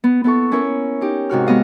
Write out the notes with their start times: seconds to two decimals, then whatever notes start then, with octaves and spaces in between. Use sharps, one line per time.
0.04 B3
0.24 B3 E4 A4 C#6
0.51 C#4 E4 A#4 C#5
1.01 D#4 G4
1.29 G#2 C3 F#4 F6
1.47 G#3 B3 D#5 F5